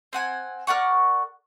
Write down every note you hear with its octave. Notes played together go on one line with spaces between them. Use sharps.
C4 F#5 G#5
A#4 D5 F#5 C#6